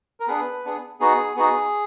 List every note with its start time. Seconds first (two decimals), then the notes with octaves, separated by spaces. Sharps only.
0.20 A#4
0.28 B3 D4 G#4 B4
0.64 B3 D4 G#4
1.00 B3 D#4 F#4 G#4
1.36 B3 D#4 F#4 G#4